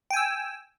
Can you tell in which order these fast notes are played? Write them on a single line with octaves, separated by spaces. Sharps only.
G5 G#5 E6